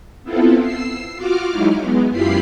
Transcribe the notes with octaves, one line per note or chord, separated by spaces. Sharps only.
B3 C4 E4 F4 A4
E6 C7
F4 F#4 D6 F6
F#3 G#3 D#4 E4
G#3 B3
F#2 E4 F4 G4 B5 C7